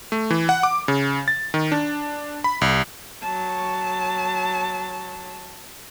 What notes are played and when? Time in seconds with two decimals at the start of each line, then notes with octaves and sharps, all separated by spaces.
0.12 A3
0.30 E3
0.49 F#5
0.63 D6
0.88 C#3
1.28 A6
1.54 D#3
1.72 D4
2.44 B5
2.61 C2
3.22 F#3 A5